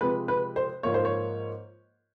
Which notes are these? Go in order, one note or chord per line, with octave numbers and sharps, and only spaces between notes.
C3 F3 G#3 B4
B4
C5
G#2 F3 A#3 C#5
C5
C#5